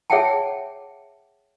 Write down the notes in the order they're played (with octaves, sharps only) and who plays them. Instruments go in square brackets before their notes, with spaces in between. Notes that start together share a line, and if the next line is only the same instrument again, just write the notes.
[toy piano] G#4 C#5 E5 F#5 G5 A5